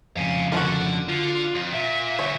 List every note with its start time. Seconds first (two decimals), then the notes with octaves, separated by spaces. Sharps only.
0.17 F2 C#3 F5 G#5
0.52 D3 F#4 A4 A#4
1.09 D3 F4
1.55 F2
1.73 A#2 E5
2.19 D2 A#2 C#5